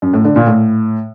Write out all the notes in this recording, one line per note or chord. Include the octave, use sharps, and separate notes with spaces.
F#2
A2
D3
A#2
A2